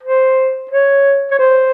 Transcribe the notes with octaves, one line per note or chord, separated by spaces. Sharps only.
C5
C#5
C#5
C5